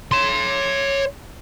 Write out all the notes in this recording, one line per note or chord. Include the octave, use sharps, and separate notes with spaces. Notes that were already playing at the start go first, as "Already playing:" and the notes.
C#5 C6